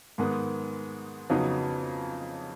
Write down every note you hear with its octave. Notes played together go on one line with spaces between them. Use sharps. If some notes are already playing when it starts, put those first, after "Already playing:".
G#2 D#3 G#3 B3
F2 C#3 F#3 B3 D#4